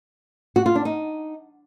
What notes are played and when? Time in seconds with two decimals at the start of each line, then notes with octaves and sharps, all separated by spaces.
0.56 F#4
0.66 F4
0.75 D4
0.85 D#4